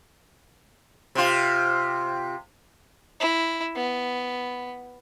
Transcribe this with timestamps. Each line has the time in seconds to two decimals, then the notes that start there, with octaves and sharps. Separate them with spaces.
1.15 C3 F4
3.20 E4
3.75 B3